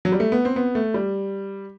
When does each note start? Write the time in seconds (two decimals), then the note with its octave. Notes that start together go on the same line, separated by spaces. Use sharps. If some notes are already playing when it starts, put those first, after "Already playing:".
0.05 F#3
0.12 G3
0.20 A3
0.32 B3
0.45 C4
0.56 B3
0.75 A3
0.94 G3